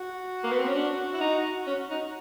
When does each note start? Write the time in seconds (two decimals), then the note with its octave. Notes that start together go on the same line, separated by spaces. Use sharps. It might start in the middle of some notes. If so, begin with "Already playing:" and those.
Already playing: F#4
0.44 A#3
0.52 B3
0.59 C4
0.67 C#4
0.75 D4
1.13 E4
1.21 D#4
1.67 C#4
1.91 D#4